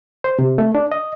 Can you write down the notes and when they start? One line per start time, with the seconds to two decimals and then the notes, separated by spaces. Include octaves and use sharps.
0.24 C5
0.39 C3
0.58 A3
0.75 D4
0.92 D#5